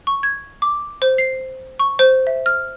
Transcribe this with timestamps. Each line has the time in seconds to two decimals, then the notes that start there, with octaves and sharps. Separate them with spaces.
0.07 C#6
0.23 G#6
0.62 D6
1.02 C5
1.18 C7
1.79 C#6
1.99 C5
2.27 E5
2.46 F6